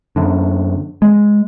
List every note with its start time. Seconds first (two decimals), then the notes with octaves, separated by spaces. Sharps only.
0.16 F#2 D3
1.02 G#3